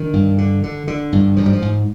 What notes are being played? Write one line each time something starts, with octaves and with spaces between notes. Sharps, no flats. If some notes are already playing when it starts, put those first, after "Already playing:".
Already playing: D3 D#3
G2
D3
D3
D3
G2
G#2 F3
G3
F3
G#2